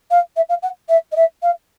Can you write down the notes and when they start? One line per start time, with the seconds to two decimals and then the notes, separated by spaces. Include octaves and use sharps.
0.10 F5
0.36 E5
0.49 F5
0.62 F#5
0.88 E5
1.11 D#5
1.16 E5
1.42 F5